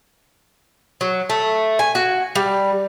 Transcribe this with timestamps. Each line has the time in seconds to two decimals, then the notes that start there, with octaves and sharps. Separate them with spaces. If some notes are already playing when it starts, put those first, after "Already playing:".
1.01 F#3
1.30 A3
1.79 G#5
1.95 F#4
2.35 G3